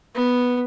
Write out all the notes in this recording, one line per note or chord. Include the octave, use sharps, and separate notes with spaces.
B3